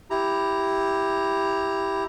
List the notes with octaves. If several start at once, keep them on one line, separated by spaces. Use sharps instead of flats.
E4 G4 A#5